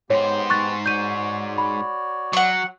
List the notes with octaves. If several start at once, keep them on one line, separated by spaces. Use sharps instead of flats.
G#2 G#3 B3 G4 C5 C#5
C#6 F#6 A6
F#4 C#5 D5 G6 D#7
B5
F#3 F#5 C#6